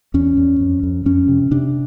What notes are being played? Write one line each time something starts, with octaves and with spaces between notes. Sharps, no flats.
E2 C#4
E2
F2
F2
F2 C#4
C3
C3 D4